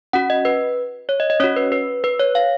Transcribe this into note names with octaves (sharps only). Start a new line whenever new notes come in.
C#4 F#4 F#5
D#5
B4
C#5
D#5
D#5
C#4 F#4 C#5
B4
B4
B4
C#5
F5